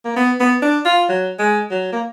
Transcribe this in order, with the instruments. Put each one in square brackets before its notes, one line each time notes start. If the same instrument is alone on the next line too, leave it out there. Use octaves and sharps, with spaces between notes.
[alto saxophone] A#3
B3
B3
D4
F4
F#3
G#3
F#3
A#3